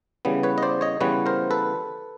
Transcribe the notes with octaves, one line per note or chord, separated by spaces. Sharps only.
C#3 E3 G3 B3
B4 C#5
D#5
C5 D5
C#5 D#5
C#3 E3 G3 B3 B4 C#5
A#4 C5
A4 B4